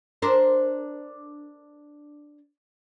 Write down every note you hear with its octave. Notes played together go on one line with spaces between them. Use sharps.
D4 A#4 C5